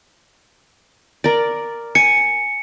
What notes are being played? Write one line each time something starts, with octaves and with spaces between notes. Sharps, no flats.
A#4 D5
G#5 C#7